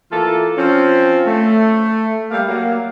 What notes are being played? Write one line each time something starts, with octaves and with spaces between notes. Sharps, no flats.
E3 A#3 F4 A4
F3 C4 C#4
A3
G3 A3 A#3 F5
F#3 A#3